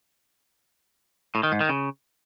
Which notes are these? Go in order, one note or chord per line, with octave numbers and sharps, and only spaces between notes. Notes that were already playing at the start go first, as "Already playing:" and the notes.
A2
D#3
G#2
D#3
C#3